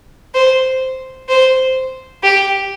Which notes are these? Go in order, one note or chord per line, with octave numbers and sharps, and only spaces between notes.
C5
C5
G4